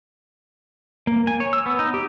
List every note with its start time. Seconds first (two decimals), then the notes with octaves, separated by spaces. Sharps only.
1.07 A#3
1.27 G#5
1.40 C#5
1.53 E6
1.66 B3
1.79 D#4
1.94 G4